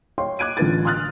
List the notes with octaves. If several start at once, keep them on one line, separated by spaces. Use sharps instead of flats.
C#5 F5 G5 C6
D6 F#6 G#6 D7 D#7
A1 D3 F4 B4 G#6 A6
C6 D#6 F6 F#6 A6